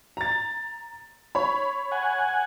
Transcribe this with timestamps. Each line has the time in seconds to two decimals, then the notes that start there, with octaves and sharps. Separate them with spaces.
0.17 A#5 A6
1.35 C#5 B5
1.92 F#5 G#5